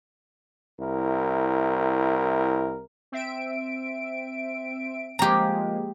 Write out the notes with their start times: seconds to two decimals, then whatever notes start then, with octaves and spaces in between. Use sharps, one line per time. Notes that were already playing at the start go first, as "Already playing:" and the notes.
0.79 C2 E4 A#4
3.12 C4 E5 D7
5.19 F3 G#3 A#3 G4 A#5